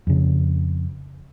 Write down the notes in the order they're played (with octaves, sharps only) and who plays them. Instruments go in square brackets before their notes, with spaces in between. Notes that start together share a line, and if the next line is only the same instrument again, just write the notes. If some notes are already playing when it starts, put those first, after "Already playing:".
[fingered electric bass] F2 C#3